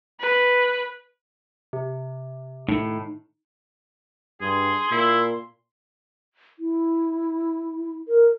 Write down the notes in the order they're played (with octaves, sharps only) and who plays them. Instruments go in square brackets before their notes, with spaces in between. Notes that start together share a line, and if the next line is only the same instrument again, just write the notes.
[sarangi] B4
[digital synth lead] C3
[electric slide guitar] A2 [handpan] D#4
[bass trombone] G2 [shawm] G#4 [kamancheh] C6
[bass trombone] A#2 [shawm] E4
[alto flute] E4
A#4